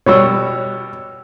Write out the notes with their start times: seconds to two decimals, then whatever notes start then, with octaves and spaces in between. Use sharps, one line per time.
0.06 B2 G3 F#4 C#5 E6